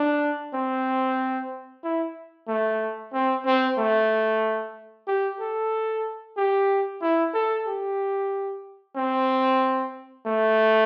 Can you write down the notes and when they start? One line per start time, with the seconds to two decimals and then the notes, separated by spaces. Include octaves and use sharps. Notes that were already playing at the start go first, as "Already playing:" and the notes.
Already playing: D4
0.54 C4
1.84 E4
2.48 A3
3.13 C4
3.46 C4
3.78 A3
5.08 G4
5.40 A4
6.37 G4
7.02 E4
7.34 A4
7.67 G4
8.96 C4
10.26 A3